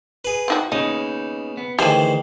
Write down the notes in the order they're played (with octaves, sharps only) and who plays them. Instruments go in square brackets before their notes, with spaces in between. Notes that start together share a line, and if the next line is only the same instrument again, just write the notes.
[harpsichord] G#4 B4
[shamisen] C4 D#4 F#4
[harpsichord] C#3 [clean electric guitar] A#3 B3 D#4 [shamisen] D#5
[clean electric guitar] B3
[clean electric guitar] D2 G#4 G5 [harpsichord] D#3 E3 C5 [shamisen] G4 G#5